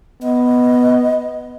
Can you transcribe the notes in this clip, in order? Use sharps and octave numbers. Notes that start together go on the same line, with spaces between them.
B3 D#5